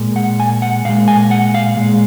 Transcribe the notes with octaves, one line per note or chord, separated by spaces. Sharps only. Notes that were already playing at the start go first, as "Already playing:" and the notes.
Already playing: A#2 G#3
F#5
G#5
F#5
A#2 G#3 F5
G#5
F#5
F5
A#2 G#3